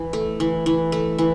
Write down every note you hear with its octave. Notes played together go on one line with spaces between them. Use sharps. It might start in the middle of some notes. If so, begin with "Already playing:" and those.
Already playing: E3
A3
E3
E3
A3
E3